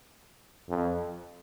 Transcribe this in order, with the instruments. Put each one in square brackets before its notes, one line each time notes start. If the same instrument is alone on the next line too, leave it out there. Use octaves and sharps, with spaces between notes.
[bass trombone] F2